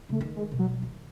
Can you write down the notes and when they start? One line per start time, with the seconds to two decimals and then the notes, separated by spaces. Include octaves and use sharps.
0.09 C#3 A3
0.21 D#3
0.36 G#3
0.52 B2
0.59 F#3
0.82 D#3